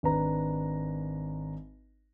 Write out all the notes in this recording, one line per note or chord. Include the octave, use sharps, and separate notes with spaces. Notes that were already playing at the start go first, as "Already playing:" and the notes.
G#1 D4 B4 A#5